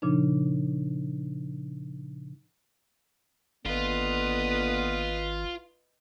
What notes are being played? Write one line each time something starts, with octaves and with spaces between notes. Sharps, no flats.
A#2 C#3 F3 D4 D#4
G#1 D3 A#3 B3 F4 B4 D#5